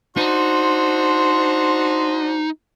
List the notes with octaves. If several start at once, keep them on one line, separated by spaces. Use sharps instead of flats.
D4 D#4 F#4 C5 C6